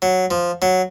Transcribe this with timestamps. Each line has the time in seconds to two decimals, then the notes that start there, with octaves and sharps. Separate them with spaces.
0.02 F#3
0.31 F3
0.62 F#3